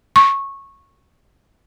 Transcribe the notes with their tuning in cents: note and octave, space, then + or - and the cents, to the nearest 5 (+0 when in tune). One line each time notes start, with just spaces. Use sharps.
C#6 -15